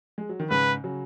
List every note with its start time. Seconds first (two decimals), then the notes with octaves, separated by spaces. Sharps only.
0.18 G#3
0.29 F#3
0.40 D#3
0.50 G#2 C#3 B4
0.84 C#3 F#3